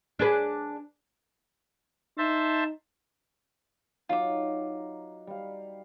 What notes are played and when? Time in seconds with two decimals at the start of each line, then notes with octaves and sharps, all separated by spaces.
0.19 D4 G#4 B4
2.18 D#4 C5 E5 A5
4.09 F#3 D#4 F4 D6
5.27 G3 F5